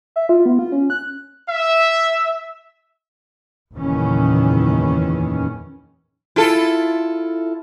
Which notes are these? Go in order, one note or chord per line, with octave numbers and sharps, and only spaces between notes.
E5
F4
B3
F4
C#4
F#6
E5
F#1 E2 A#2 D#3 E3 C#4
E4 F4 A4